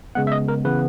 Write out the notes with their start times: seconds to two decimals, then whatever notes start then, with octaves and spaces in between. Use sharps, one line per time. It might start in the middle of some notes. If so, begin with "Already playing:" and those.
0.15 C#3 G#3 B3 F#5
0.27 E5
0.32 D#5
0.48 A#4
0.65 C#3 E3 B3 B4